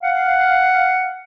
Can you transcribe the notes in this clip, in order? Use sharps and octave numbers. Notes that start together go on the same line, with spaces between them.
F5 F#5